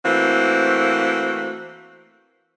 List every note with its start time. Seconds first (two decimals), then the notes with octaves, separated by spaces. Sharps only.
0.05 E3 A3 A#3 C4 F#4